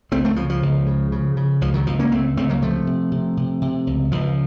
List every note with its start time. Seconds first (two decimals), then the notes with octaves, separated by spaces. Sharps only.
0.11 C#2 A3 C4
0.25 A3 C4
0.36 C#3 F3
0.50 F3
0.62 C#2
0.87 C#3
1.12 C#3
1.37 C#3
1.61 C#2 F3
1.74 D#3 F#3
1.87 C#2 F3
1.99 A#3 C#4
2.11 C#2 A3 C4
2.37 C#2 A3 C4
2.49 F#3 A#3
2.61 C3 F3 A3
2.87 C3
3.12 C3
3.37 C3
3.61 C3
3.87 C#2
4.12 C#2 F3